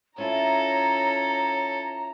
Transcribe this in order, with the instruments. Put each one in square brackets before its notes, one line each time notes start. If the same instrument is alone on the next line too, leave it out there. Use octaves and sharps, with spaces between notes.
[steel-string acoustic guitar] C#4 E4 F4 [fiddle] A4 [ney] C#5 [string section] A#5